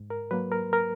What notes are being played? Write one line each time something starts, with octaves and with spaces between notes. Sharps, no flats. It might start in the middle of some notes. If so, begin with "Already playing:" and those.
Already playing: G#2
A#4
F#3 A#3 B4
A#4
A#4